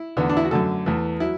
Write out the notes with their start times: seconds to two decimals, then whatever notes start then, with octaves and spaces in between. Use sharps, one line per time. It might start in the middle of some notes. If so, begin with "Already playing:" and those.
Already playing: E4
0.17 E2 D3 B3
0.29 D4
0.37 E4
0.45 F#4
0.51 F#2 D3 A3 A4
0.86 E2 E3 A3
1.20 F#3 E4